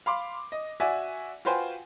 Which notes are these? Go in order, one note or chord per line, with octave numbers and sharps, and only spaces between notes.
F5 B5 C6 D6
D#5
F#4 D5 E5 G#5
F4 F#4 B4 C5 G5 G#5